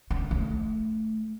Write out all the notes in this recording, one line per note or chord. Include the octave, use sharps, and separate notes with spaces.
D3
A3